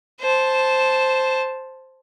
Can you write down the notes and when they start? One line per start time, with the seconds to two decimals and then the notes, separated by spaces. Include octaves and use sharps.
0.20 C5 A5